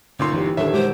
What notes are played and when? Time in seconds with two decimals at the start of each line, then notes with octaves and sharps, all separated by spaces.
0.19 G1 A#2 D3 C#4 D#4 C6
0.33 E3 G4
0.57 D#1 D4 A4 C#5 E5
0.74 G#3 F#4 G4 C5